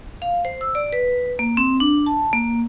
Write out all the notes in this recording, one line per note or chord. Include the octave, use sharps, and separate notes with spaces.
F5
C5
E6
D5
B4
A#3
C4
D4
A5
A#3